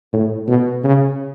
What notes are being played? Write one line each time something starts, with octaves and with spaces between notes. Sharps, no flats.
A2
B2
C#3